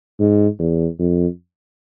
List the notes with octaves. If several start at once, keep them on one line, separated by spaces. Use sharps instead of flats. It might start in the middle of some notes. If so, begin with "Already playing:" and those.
G#2
E2
F2